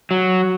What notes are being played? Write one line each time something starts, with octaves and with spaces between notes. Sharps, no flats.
F#3